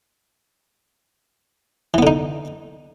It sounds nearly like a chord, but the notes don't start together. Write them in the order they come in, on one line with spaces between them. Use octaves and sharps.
E3 B3 D3 D#4